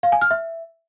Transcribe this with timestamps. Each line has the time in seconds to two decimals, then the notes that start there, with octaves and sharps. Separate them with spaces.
0.03 F5
0.12 G#5
0.21 F6
0.31 E5